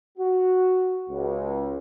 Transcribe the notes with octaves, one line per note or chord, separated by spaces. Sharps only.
F#4
C#2